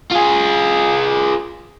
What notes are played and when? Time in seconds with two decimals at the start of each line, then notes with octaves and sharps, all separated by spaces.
0.12 F4 G#4